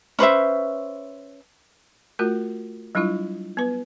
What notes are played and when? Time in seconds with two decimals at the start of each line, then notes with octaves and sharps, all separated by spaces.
0.19 C#4 B4 C5 E5
2.19 A3 F4 F#4 A#4
2.95 F#3 G3 D4 E4 F4
3.57 B3 B4